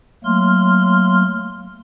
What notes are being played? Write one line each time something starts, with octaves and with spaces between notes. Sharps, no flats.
F#3 A3 A#3 C6 F6